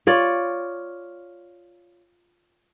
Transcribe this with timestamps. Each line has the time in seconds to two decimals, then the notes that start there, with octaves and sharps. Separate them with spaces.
0.07 F4 C#5 D5